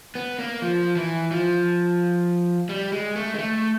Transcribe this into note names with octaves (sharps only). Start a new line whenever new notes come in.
B3
A#3
F3
E3
F3
G3
G#3
A3
G#3
A3